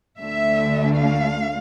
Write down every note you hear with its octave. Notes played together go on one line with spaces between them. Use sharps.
D2 D3 A3 E5
F5